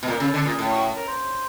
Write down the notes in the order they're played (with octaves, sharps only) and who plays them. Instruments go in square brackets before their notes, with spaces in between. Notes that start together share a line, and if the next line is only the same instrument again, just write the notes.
[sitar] B2
[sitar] A#2 [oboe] A#4
[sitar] C#3 [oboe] A4
[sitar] D3 [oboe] A4
[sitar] A#2 [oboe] G#4
[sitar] A2
[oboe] F#4
A#4
C5